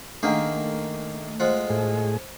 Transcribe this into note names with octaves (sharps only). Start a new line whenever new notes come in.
D#3 A3 A#3 D4 G#4 F5 F#5
G#3 F4 C5 F#5
A2 G#4